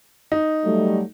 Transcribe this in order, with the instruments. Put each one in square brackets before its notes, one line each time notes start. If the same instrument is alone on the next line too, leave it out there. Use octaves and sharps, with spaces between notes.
[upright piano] D#4
[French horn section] F#3 G3 A3